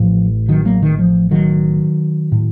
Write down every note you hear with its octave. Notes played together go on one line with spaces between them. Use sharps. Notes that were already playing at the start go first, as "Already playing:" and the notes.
Already playing: A1 A2 F3
D#3 F#3
F#3 A#3
D#3
F3
D#3 F#3
A2